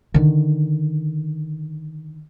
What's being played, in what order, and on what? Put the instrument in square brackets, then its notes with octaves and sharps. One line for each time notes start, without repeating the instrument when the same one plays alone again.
[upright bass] D3 D#3